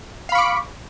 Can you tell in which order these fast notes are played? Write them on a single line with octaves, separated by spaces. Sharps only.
F5 B5 C#6 D6